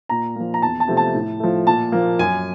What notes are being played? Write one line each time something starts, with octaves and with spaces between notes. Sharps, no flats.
A#2 A#5
F3 A#3
A#5
E2 A5
A5
C3 F3 A3 C4
A5
A2
F3 A3
A#2 A5
F3 A#3
F#2 G#5